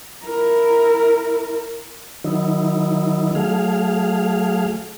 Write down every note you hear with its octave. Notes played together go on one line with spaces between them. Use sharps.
E4 A#4
D#3 F#3 D#4 E4
F#3 A3 G#4 F5